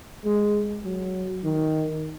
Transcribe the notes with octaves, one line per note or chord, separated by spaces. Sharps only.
G#3
F#3
D#3